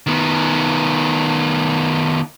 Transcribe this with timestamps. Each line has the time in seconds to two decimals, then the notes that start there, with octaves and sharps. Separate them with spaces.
0.07 D#3 B3